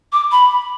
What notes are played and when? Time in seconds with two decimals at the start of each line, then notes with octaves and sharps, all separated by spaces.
0.12 D6
0.32 B5